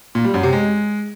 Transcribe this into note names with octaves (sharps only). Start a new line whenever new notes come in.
A#2
G3
F#2
C3
G#3